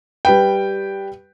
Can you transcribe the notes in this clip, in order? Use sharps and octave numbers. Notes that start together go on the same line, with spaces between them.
G3 B4 G5